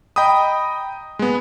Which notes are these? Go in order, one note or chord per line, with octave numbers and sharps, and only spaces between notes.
D#5 G5 A#5 B5 D#6
G#3 B3